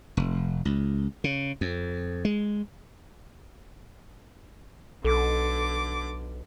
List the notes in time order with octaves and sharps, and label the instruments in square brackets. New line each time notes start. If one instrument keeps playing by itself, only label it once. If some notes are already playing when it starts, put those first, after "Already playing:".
[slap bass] F1
C#2
C#3
F2
G#3
[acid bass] B1 [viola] D3 D6 [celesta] A4